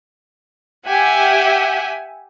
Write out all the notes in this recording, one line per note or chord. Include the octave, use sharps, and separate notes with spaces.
G4 E5 F#5 G#5